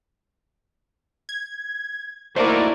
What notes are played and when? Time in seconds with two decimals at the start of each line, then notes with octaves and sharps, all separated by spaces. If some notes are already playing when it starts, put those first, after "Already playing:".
1.29 G#6
2.36 A3 A#3 D#4 E4 F#4 A#4 C5 D5